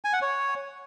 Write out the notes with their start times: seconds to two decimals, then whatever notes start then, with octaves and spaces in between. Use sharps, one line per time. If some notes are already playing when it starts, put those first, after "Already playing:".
0.05 G#5
0.13 F#5
0.22 C#5